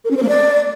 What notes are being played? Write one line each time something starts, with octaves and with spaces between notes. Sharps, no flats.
A#4
C#4
C5
A#3
D5